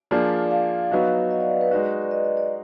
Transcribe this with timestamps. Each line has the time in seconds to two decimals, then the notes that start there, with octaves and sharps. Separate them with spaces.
0.11 F3 A#3 D4 F4 G#4 D5
0.51 F5
0.91 F#3 B3 D#4 F#4
1.31 D#5
1.40 D5
1.50 B4
1.61 B4
1.71 G#3 D#4 F#4 D5
2.02 D5
2.11 D#5
2.24 D#5
2.37 D5